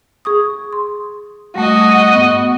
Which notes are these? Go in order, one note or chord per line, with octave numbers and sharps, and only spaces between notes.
G#4 C#6 D#6
C6
G3 A3 F#4 D#5
G#2 B3